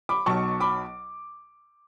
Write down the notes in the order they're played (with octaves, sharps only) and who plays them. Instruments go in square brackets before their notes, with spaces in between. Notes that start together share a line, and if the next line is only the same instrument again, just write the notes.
[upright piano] B5 D6
B1 B2 F#3 A5 C#6
B5 D6